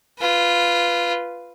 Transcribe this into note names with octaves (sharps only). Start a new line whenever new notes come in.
F4 B4